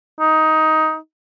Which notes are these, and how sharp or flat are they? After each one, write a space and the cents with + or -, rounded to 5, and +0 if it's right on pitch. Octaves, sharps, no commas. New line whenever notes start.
D#4 +15